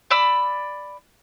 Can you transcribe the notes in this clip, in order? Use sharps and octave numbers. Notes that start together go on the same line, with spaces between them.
D5 B5 E6